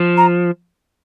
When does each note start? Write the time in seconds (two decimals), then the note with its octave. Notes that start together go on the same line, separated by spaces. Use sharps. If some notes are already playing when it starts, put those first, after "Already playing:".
Already playing: F3
0.17 A#5